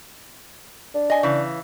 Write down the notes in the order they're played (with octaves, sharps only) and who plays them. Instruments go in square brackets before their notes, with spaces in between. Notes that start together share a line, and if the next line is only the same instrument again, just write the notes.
[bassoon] D4
[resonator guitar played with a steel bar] D#5 G#5
C#3 E3